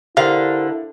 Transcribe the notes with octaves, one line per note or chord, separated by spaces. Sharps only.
D3 E4 G4 A#4 C5 F5